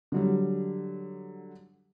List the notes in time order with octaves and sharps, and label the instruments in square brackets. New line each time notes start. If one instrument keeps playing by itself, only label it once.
[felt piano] D3 F#3 G3